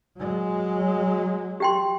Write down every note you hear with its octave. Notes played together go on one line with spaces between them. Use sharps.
F#3 G#3
G4 G5 C6